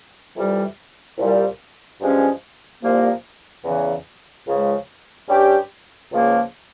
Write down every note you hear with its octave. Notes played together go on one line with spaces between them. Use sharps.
F2 C3 E3 G3
C2 A#2 G3
G2 F3 G#3 C#4
C2 A#2 F3 A#3
E2 C#3 E3
C#2 C#3 F3 G#3
G2 G3 C#4 G4
C#2 C#3 F3 A#3